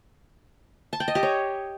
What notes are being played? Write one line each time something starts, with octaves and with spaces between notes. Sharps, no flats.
A5
G5
D#5
G4
C#5